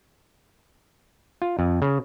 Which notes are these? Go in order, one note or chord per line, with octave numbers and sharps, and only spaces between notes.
F4
F2
C#3